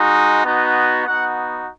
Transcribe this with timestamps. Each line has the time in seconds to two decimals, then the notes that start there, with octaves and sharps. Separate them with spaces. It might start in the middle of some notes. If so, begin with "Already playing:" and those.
Already playing: G#3 D#4 F#4
0.44 B3 D#4 F#4
1.06 B3 D#4 F#4 F#5